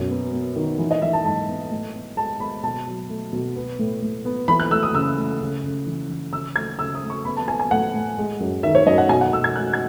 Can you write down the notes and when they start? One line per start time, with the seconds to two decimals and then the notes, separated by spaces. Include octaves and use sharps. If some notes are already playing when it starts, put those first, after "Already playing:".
Already playing: F#2 B2
0.10 B3
0.33 B3
0.56 D#3
0.79 E3
0.91 D#5
1.02 E3 E5
1.13 A5
1.25 G#2 A5
1.48 B3
1.71 A2
1.95 B3
2.17 G#3 A5
2.40 B3 B5
2.63 B2 A5
2.87 F#3
3.09 A3
3.33 B2
3.56 B3
3.79 A2
4.02 A2
4.25 B3
4.48 E3 B5
4.60 F#6
4.71 A3 E6
4.83 D#6
4.94 C#3 E6
5.17 A3
5.41 C#3
5.64 C#3
5.87 E3
6.09 E3
6.33 C#3 E6
6.56 A3 G#6
6.79 C#3 E6
6.95 D#6
7.02 A3
7.10 C#6
7.25 B3 B5
7.37 A5
7.48 B3 G#5
7.60 G#5
7.71 A2 F#5
7.94 A2
8.18 G#3
8.40 F#2
8.63 D#3 E5
8.75 C#5
8.86 F#2 D#5
8.98 F#5
9.09 B2 G#5
9.21 F#5
9.32 B2 E6
9.44 G#6
9.56 A3 F#6
9.73 G#6